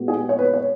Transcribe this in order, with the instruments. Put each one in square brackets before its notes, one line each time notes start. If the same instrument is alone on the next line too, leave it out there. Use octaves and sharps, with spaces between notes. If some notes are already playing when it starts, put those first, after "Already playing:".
Already playing: [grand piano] A#2 G#3 B3 F#4
[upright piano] G#4
C#5
B4
C#5